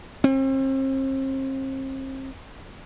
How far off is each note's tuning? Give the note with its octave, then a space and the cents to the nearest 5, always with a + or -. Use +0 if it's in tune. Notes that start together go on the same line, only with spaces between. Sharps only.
C4 +40